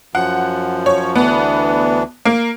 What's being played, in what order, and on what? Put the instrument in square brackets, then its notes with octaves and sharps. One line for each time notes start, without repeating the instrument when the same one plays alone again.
[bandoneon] F#2 F3 [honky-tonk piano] F#5
[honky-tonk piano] C#5
[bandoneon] D2 E3 D4 [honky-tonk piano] B3
[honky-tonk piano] A#3